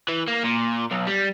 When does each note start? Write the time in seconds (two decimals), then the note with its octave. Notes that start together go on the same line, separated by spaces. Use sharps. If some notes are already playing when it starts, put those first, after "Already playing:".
0.08 E3
0.28 A#3
0.44 A#2
0.91 B1
1.07 G3